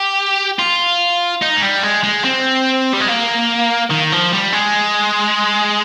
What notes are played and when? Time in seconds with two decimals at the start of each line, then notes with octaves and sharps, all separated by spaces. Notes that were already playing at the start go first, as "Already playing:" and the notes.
Already playing: G4
0.59 F4
1.42 D#4
1.57 G#3
1.62 G3
1.83 G#3
2.03 G#3
2.24 C4
2.93 G3
3.00 G#3
3.08 A#3
3.90 D#3
4.12 F3
4.33 G3
4.53 G#3